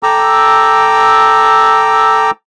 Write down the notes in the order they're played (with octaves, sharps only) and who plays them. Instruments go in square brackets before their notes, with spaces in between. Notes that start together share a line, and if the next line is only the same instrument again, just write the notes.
[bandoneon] A4 G5 A#5 D6 E6